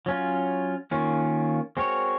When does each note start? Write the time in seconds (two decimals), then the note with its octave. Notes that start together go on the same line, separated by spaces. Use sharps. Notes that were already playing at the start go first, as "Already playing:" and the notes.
0.06 F#3 C#4 F4
0.91 D#3 A#3 C#4 F4
1.77 G#3 C4 F#4 A#4 C#5